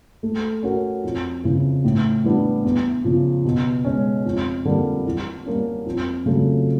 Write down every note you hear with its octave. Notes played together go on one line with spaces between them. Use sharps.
A3
C#4 F#4 A#4
F2
C#3 E3
A2
E3 G3 B3 D4
E2
C#3 F3
B2
G#3 C#4
F2
D3 G3 A#3
E3
G3 A#3 C#4
F2
C#3 F#3 A3